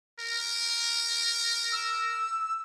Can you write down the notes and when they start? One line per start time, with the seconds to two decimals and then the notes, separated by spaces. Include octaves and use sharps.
0.19 A#4
1.72 E6